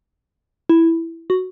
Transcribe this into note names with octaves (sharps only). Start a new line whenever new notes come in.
E4
F#4